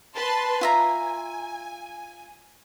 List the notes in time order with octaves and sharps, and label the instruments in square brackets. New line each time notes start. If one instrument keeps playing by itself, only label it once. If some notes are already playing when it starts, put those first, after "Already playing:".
[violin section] B4 A5 C6
[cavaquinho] F4 E5 A#5 [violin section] G#5